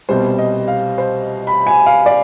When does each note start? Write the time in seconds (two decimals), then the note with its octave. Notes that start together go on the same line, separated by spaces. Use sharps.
0.09 C2 B2 G3 C5
0.38 D#5
0.68 F5
0.98 C5
1.47 B5
1.67 G#5
1.86 F5
2.06 D5